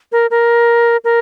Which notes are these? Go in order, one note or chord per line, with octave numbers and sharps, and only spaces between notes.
A#4
A#4
A#4